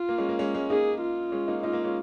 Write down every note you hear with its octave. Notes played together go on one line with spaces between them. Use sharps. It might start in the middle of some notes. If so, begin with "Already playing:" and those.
Already playing: F4
A#3
G#3 C#4
A#3
G#3 C#4
G#3 C#4
A#3 D#4 G#4
F4
G#3 C#4
A#3 D#4
A#3 D#4 F4
A#3
G#3 C#4